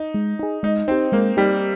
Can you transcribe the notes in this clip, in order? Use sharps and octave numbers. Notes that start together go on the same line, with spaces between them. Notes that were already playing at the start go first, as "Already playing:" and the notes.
Already playing: D#4
G#3
D#4 G#4
G#3 D#4
C4 D#4 G4
G#3 A#3
G3 D#4 G4